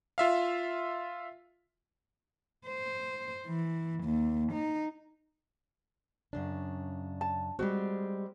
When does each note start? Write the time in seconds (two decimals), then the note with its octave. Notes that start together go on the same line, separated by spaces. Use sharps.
0.18 F4 E5 F5
2.67 C5
3.47 E3
4.04 D#2
4.53 D#4
6.33 F#2 C#3 D4
7.21 A5
7.59 G3 G#3 C4 F#4